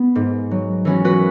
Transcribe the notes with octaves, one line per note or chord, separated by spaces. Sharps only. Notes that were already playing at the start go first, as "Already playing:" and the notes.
Already playing: B3
G#2
F#3
E3 C#4 F#4
F#4 B4